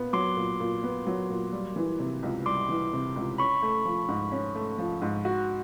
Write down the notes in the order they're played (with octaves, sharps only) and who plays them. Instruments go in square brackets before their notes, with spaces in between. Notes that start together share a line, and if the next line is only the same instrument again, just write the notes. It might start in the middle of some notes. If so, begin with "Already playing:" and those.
Already playing: [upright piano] A#2 B3
[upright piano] F#3 [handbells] C6 D6
[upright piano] A#2
A#2
B3
F#3
A#2
G3
E3
C3
C#2
[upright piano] G3 [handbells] C6 D6
[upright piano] E3
C3
C#2
[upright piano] C#4 [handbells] B5 C#6
[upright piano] A3
F3
G#2
C#4
A3
F3
G#2
F#4